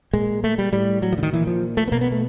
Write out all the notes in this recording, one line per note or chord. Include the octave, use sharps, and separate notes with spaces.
A#2 G#3
A3
G3
A2 G3
F#3
F3
D3
D#3
A#2 E3
F3
A3
B3
B2 A#3
B3
A3